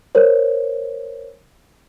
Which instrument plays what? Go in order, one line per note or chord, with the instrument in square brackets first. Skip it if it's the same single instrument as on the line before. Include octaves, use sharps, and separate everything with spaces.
[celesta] A#4 C5 C#5